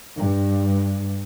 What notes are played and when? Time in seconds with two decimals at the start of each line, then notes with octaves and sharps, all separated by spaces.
0.19 G2